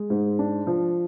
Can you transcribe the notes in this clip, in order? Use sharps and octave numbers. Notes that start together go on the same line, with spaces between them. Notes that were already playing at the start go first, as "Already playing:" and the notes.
Already playing: G#3
G#2
D4
F3